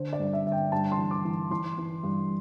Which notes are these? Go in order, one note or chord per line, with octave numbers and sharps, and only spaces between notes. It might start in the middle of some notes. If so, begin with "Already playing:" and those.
Already playing: D3 C5
D5
G2
E5
D3 E5
G5
G2 A5
C6
E3
D6
E3
E3 C6
E3
G2